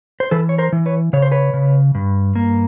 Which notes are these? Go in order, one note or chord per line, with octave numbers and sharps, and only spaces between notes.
C5
E3 A4 B4
C#5
A#4 C5
E3
B4 C#5
C#3 C#5
C5
B4 C#5
C#3
G2
A#3